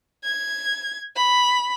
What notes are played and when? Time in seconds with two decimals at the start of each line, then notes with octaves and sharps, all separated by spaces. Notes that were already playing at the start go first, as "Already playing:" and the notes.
0.24 G#6
1.16 B5